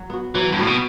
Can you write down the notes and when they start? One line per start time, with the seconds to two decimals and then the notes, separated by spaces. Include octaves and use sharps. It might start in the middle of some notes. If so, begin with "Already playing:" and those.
Already playing: F#3
0.10 B3 F#4
0.35 E3 F#3
0.52 G2
0.59 A2 F#4
0.63 B2 B3